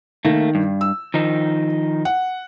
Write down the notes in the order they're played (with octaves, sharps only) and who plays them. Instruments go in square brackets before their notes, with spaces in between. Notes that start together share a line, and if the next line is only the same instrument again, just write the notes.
[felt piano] D#3 [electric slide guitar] A3 A#3
[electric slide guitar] G2
[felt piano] E6
[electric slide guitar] D#3 F3 D#4
[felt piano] F#5